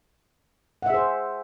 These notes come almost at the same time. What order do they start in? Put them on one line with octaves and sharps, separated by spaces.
F#5 E5 G#4 C5